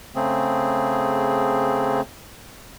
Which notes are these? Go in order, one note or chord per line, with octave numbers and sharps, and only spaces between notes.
C#3 A3 C4 G#4